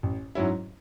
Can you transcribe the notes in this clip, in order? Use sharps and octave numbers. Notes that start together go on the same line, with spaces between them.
A1
G#2 F#3 C#4 E4